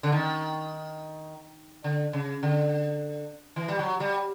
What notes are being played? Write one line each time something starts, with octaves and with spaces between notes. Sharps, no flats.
D3
D#3
D3
C#3
D3
E3
G3
F#3
G3